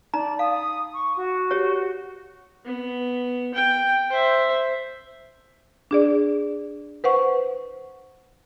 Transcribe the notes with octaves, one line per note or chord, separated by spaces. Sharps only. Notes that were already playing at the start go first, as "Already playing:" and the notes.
D#4 D5 A#5
F5 D#6
C#6
F#4
G4 C#5
B3
G5
C5 E5
D4 G#4 D5
B4 C5 F#5 C#6